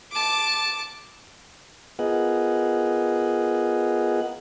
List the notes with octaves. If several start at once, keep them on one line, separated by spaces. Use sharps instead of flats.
A5 D6
B3 F4 G#4 A#4 D#5 F#5